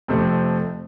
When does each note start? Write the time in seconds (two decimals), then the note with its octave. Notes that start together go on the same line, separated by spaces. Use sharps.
0.08 F2 C3 A3 C4